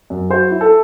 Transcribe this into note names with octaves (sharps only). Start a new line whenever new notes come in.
F#2
F#3 C5
E4
A4